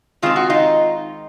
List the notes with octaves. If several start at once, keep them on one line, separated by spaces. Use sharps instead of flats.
D#3 G#3 C4 F4
F#4
D#4 F4